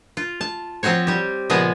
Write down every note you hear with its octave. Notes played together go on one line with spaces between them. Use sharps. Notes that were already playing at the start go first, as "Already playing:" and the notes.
F4
A5
F3 C4 F#4 C5 C#5
G3 G4
A#2 C#3 F3 G#3 B3 G#4